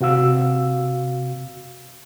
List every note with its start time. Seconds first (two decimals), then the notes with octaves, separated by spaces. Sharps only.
0.01 C3 F#4 F5 E6